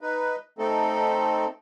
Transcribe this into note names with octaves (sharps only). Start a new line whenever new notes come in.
D#4 B4
A3 C4 D#4 A4